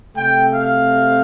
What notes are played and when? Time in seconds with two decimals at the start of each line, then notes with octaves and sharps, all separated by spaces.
0.15 C3 A3 C4 G5
0.53 F5